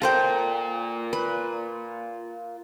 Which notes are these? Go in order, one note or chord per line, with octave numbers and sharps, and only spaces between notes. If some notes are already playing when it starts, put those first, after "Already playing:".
F4 A4 A#4 C5 G5
B4